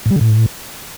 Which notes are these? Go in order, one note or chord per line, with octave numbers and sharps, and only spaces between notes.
A2
G3
D3
A2